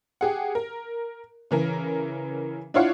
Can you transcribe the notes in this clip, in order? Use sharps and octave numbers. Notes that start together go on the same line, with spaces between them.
G4 G#4 F#5
A#4
C#3 E3 A#4
D4 E4 F4 C#5 F5 F#5